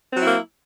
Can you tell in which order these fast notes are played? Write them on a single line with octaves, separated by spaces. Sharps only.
C4 F#3 E4 A#3